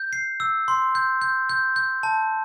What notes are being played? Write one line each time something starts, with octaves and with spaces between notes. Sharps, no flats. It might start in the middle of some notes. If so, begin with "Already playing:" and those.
Already playing: G6
C7
E6
C6
G6
G6
G6
G6
A5